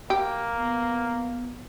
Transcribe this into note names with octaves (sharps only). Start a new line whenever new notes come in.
A#3 G4
B3